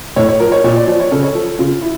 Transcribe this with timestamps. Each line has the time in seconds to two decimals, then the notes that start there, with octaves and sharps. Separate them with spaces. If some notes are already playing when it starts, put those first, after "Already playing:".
0.16 A2 C#5
0.29 C#5
0.40 F3 A#4
0.52 C#5
0.64 A#2 C#5
0.76 D5
0.87 F3 D5
1.00 C#5
1.11 C#3 A4
1.23 C#5
1.34 F3 A4
1.59 C#3 F4
1.82 E4